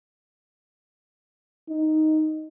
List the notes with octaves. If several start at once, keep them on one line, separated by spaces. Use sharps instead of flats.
D#4